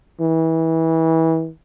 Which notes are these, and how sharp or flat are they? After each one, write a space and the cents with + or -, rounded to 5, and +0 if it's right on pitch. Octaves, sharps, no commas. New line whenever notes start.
E3 -25